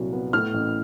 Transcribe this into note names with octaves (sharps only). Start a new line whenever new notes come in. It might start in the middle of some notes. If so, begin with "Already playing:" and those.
Already playing: C2 A#2 F#3
B3
A2 F6
A1